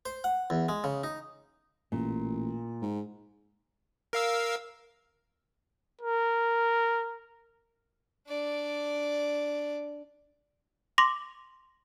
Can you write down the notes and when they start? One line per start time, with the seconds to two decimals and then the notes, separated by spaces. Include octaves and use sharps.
0.06 C5
0.24 F#5
0.50 E2
0.69 G#3
0.84 C#3
1.04 D#4
1.92 A1 A#2
2.82 G#2
4.13 A#4 F5 E6
6.01 A#4
8.28 D4 D5
10.98 C6 D6 A#6 F7